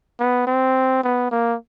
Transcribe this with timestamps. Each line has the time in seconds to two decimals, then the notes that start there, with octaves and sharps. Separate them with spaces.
0.19 B3
0.47 C4
1.04 B3
1.31 A#3